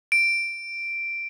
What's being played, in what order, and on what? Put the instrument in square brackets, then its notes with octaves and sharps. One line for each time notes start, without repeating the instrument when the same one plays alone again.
[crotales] D7